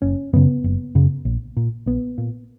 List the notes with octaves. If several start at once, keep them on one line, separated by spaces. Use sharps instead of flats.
F#1 C#4
F#2 C#3 B3
F#1
F#2 C#3
A#1
A#2
A#1 B3
A#2